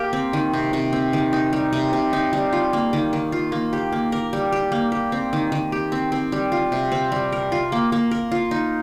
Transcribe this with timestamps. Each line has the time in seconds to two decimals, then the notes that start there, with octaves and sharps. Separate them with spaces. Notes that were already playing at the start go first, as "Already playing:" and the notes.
Already playing: A#3 G4 A#4
0.13 C4
0.33 D#3
0.53 C3
0.73 C3
0.93 C4
1.13 D#3
1.33 D#4
1.53 G3
1.73 C3
1.93 C3
2.13 D#4
2.33 G3
2.53 F4
2.73 A#3
2.93 D#3
3.13 D#3
3.32 F4
3.52 A#3
3.73 G4
3.92 A#3
4.12 A#4
4.33 G3
4.52 G4
4.72 A#3
4.92 G4
5.12 C4
5.33 D#3
5.52 D#3
5.72 G4
5.92 C4
6.12 C4
6.32 G3
6.52 F4
6.72 C3
6.92 C4
7.12 G3
7.32 A#4
7.52 F4
7.72 A#3
7.92 A#3
8.11 A#4
8.32 F4
8.51 D#4